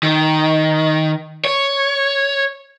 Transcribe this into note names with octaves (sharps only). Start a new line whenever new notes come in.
D#3
C#5